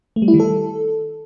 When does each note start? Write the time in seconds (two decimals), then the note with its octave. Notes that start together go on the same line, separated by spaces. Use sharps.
0.16 A3
0.22 G3
0.28 E4
0.34 D#3
0.40 A4